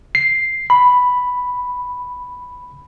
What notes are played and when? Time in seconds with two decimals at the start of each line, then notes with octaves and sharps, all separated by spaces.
0.15 C7
0.70 B5